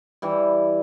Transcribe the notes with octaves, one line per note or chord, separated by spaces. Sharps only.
E3 G3